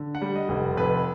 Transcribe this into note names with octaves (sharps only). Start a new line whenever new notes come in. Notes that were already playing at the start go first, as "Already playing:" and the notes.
Already playing: D3
F#5
G3
D#5
F1
F2 B4